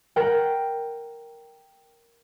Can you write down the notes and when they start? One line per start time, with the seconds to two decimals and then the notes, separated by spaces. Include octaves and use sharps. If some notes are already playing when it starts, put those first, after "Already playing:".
0.16 A#4 F#5 G5